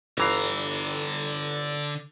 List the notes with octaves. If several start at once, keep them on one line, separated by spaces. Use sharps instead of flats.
G1 D3 E3 F5 A#5